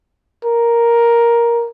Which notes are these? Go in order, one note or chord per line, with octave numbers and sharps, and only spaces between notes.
A#4